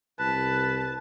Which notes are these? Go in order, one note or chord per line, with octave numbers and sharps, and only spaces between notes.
C2 B4 A5